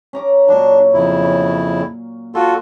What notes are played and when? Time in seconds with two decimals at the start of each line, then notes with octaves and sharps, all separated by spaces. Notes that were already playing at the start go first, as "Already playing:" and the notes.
0.13 C#4 A#5 D6
0.48 A#2 F#3 D4
0.94 F2 C#3 E4
2.35 F4 F#4 A4 C6